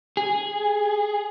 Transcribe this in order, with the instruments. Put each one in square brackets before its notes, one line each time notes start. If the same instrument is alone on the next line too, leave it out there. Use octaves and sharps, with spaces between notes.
[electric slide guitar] G#4